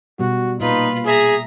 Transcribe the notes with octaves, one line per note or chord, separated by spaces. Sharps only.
B2 G3 F#4
A#2 D#4 F4 B4
G#4 E5 A#5